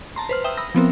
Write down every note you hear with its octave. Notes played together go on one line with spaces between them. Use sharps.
A5 A#5 C6
B4 C5 F6
E5 G5 D#6 E6
B5 D#6 E6 A#6
F3 B3 C4 A#4